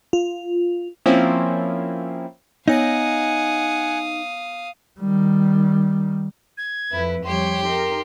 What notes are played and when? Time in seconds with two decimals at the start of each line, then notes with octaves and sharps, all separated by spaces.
0.13 F4
1.06 F3 A#3 C4 C#4 E4
2.68 B3 D#4 C#5 F5 F#5 G#5 D#6 A#6
5.00 D#3 G3
6.58 G#6
6.92 F2 E4 B4
7.25 F2 G3 G4 C#5 C6
7.64 D#4 A#4 C6